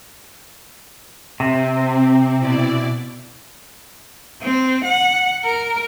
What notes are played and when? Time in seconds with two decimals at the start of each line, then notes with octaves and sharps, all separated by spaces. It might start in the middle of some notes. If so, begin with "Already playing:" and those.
1.40 C3 C4
2.39 B2 E4 D5
4.42 C4
4.85 F#5
5.44 A#4